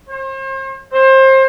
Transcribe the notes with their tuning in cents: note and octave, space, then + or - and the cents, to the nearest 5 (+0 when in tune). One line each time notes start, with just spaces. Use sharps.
C5 +40
C5 +25